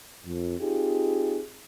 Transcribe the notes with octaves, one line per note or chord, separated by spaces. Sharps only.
F2
C4 D#4 F4 G4 G#4